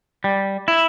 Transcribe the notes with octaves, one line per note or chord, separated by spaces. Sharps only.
G3
E4